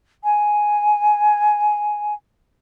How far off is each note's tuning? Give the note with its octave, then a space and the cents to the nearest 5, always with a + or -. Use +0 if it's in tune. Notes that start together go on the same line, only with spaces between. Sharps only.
G#5 +5